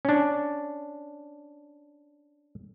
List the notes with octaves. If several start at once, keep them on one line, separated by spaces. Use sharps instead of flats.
C#4 D4